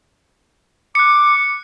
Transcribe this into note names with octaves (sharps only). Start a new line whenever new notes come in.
D6 F#6 C#7